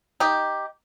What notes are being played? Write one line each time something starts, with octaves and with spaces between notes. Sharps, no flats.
D#4 G4